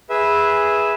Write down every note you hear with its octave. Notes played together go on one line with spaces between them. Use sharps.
G#4 B4 E5